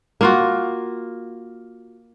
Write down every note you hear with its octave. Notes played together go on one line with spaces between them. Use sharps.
A#3 F4 F#4